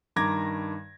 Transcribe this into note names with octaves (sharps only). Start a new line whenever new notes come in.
G2 D#3 A#5 D6 G#6 A#6